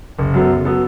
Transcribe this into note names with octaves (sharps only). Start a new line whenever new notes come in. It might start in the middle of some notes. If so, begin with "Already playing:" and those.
F#1
F#2 F#3 B3 A4
F#1
F#3 B3 A4